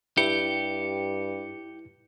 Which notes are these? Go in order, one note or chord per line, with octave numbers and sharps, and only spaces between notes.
G2 E4 G4 C#7